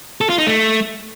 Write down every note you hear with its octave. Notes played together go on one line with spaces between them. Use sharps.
A4
F4
D#4
A3